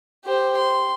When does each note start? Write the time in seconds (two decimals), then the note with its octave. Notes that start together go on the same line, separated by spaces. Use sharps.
0.24 G4 C5
0.57 C6